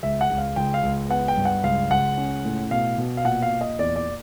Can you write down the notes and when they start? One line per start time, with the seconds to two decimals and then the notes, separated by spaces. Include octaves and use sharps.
0.03 C#2 E5
0.21 F#5
0.30 C#2
0.38 F5
0.56 C#2 G5
0.74 F5
0.83 C#2
1.09 B3 F#5
1.28 G5
1.37 G2
1.45 F#5
1.63 C#2 F5
1.90 C#2 F#5
2.17 C#4
2.45 A2
2.71 B2 F5
2.98 B2
3.17 F5
3.24 A#2 F#5
3.42 F5
3.52 A#2
3.61 D#5
3.79 E2 D5
3.96 D5